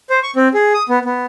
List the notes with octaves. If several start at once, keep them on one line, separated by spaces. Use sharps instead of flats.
C5
C#6
C4
G#4
D#6
B3
B3